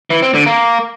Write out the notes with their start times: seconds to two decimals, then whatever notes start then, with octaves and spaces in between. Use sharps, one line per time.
0.10 E3
0.22 C4
0.34 D3
0.46 A#3